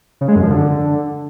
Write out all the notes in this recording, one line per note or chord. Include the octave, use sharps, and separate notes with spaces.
C#3
G#3
F#2
F3
D3